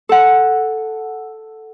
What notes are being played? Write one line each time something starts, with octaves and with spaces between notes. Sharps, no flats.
A4 F#5